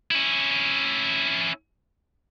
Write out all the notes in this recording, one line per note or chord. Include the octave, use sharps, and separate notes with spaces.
C#4 E4